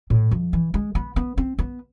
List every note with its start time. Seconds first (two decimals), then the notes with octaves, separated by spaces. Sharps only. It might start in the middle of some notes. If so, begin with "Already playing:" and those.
0.10 A2
0.31 F2
0.53 E3
0.74 G#3
0.95 B3
1.16 B3
1.38 C4
1.59 B3